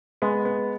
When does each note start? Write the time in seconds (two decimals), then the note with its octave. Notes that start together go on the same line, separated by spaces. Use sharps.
0.22 G#3 B3
0.45 B3